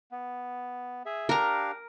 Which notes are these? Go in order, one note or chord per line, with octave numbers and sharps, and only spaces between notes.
B3
G#4 E5
D4 G4 A#4 F5 A#5